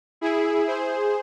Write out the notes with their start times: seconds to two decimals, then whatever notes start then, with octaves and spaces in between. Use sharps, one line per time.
0.21 E4 G#4
0.67 G#4 C5